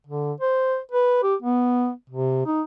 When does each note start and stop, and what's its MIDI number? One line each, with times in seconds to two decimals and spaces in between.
0.07 0.33 50
0.40 0.78 72
0.92 1.22 71
1.23 1.35 67
1.42 1.90 59
2.10 2.43 48
2.46 2.62 63